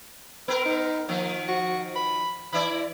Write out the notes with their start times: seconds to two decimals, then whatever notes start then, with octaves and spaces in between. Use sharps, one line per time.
0.48 B3 A#4 B4
0.66 D#4
1.09 D#3 F3 A#3
1.48 F#4
1.96 B5
2.53 E3 E4 D5 B5